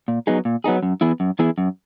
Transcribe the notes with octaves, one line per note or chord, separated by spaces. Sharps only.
A#2
F#3 B3 D#4 G#4
A#2
F#3 B3 D#4 G#4
F#2
E3 B3 E4 G#4
F#2
E3 B3 E4 G#4
F#2